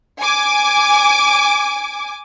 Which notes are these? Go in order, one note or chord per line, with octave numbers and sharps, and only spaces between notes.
G#5 D6